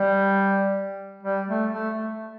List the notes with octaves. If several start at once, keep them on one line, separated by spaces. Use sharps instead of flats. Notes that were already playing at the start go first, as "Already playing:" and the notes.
Already playing: G3
G3
A3
A3